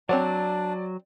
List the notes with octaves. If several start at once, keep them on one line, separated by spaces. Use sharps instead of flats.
F#3 C4 D4 C#5 D5 F#5